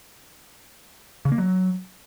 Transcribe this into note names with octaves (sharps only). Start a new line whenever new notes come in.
C#3
A#3
F#3